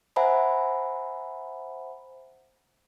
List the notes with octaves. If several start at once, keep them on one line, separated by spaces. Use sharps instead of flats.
C5 E5 F#5 G#5 A#5 B5